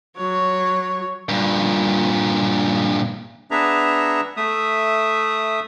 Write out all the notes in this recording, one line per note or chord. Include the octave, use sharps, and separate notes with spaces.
F#3 C#5
G2 A#2
B3 D4 G#4 B4 E5 A#5
A3 E5 D#6